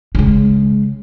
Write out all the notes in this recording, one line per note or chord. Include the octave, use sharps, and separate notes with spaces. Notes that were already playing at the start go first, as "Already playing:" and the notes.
C#3 G#3